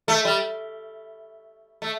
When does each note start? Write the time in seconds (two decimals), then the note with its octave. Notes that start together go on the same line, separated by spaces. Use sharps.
0.08 A3
0.25 G3
1.82 A3